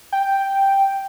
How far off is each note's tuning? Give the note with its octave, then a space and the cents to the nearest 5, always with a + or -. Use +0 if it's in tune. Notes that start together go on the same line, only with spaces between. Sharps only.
G5 +0